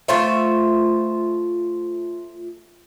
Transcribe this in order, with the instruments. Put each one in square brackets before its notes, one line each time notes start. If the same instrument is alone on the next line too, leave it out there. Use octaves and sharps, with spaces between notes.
[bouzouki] A3 F4 C5 E5